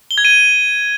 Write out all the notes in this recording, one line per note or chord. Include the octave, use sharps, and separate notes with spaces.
G7
G#6
D#7